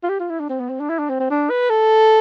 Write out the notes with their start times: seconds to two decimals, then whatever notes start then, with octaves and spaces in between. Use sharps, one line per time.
0.03 F4
0.09 G4
0.20 F4
0.30 E4
0.40 D4
0.49 C4
0.60 B3
0.69 C4
0.80 D4
0.90 E4
0.99 D4
1.10 C4
1.20 C4
1.30 D4
1.50 B4
1.70 A4